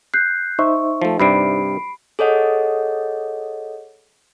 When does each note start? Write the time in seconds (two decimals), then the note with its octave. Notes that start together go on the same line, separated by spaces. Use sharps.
0.14 F#6 G6 C7
0.59 D#4 C5 E5 C#6
1.02 F3 A3
1.20 G2 C3 G3 B5 C7 D7
2.19 G#4 A4 C#5 D#5 F#5